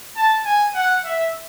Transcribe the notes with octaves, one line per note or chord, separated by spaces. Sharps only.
A5
G#5
F#5
E5